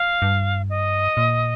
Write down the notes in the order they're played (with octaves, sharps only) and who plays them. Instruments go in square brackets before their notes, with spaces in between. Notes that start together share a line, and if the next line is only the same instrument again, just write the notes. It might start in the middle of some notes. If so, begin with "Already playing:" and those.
Already playing: [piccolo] F5
[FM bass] G2
[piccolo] D#5
[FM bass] A#2